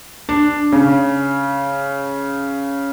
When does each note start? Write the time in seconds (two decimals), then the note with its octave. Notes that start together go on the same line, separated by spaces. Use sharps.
0.29 D4
0.72 C#3